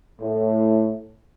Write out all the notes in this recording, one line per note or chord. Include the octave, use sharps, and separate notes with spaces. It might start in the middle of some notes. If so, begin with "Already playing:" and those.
A2